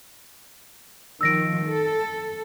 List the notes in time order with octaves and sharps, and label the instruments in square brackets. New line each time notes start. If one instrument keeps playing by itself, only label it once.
[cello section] D#3 F3 [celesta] E6 A#6 D7
[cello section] A4